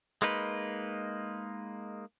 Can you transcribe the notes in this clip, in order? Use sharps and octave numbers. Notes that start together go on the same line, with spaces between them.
G#3 A#3 D#4 B4